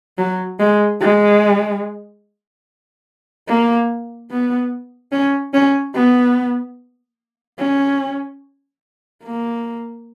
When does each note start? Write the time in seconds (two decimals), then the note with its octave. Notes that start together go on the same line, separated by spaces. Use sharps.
0.18 F#3
0.60 G#3
1.01 G#3
3.48 A#3
4.31 B3
5.12 C#4
5.54 C#4
5.95 B3
7.59 C#4
9.24 A#3